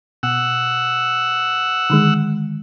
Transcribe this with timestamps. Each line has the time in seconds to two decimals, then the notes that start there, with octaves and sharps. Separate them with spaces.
0.23 B2 F#5 E6
1.90 D3 D#3 G#3